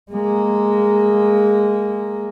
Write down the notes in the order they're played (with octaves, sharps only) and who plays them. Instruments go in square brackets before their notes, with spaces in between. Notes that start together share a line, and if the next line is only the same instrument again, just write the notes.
[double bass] G#3 A#3